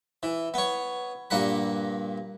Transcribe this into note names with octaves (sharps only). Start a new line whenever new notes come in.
E3
B3 C#5
G2 A#2 A#3 F#5 B5